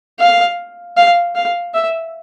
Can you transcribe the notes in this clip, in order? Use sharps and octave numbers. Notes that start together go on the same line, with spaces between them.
F5
F5
F5
E5